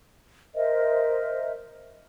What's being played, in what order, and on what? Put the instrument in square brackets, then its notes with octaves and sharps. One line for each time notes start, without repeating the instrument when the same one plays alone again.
[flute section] A#4 C5 D#5 E5